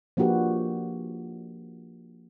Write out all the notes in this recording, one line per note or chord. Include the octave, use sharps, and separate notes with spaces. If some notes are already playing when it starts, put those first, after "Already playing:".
F3 A#3 D4 F#4 G4 B4